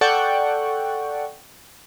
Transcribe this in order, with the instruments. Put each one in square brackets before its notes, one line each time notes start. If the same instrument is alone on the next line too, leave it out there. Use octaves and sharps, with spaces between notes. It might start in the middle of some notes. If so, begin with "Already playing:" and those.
[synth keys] A4 D5 F#5 G5 C#6